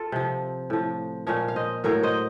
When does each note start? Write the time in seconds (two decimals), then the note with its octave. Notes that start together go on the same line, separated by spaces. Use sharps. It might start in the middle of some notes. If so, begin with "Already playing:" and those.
Already playing: F4 A4
0.12 C3 F3
0.70 A2 F3
1.27 A#2 F3 C#5 F5
1.48 F5
1.56 C5 D#5
1.84 A2 F#3 A#4 C#5
2.03 C5 D#5